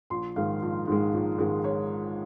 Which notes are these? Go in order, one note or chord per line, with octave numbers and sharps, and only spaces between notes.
A#1 C6
G#2 D#3 G#3 F5
A#1
G#2 D#3 G#3
A#1
G#2 D#3 G#3
C#5